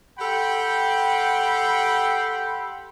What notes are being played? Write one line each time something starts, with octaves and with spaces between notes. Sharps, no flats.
G4 A4 F#5 G5 B5 C6